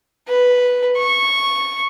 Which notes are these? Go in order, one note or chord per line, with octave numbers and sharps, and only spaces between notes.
B4
C#6